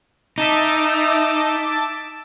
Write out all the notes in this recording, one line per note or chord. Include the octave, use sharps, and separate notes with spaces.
D#4 E5 A5 D6